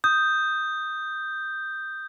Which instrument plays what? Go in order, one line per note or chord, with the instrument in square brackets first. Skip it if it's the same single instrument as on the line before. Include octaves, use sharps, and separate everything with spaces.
[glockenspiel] D#6 [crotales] G6